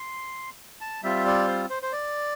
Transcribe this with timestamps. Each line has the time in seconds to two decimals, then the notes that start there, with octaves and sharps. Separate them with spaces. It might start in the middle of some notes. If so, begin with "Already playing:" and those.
Already playing: C6
0.81 A5
1.03 G3 C4 F4 E5
1.26 D5
1.48 C5
1.70 C5
1.83 C5
1.93 D5